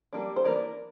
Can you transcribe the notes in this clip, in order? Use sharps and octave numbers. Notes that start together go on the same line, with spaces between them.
G3 A#3 D4
C5
E3 A#3 D4 A#4 D5